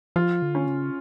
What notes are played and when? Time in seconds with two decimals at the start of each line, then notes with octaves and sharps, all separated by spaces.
0.16 F3 F4
0.42 D3
0.55 C#4
0.67 C#3